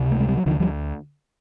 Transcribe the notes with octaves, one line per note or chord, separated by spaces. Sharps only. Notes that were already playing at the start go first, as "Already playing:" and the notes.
Already playing: C#2 C3
A3
G#3
G3
F#3
D2 D3 D#3 F3
F3 G3